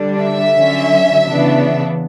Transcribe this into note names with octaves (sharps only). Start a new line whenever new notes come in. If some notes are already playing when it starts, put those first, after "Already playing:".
Already playing: D3 G3 D4
E5
D3 F#3 C#4
C#3 E3 B3 D4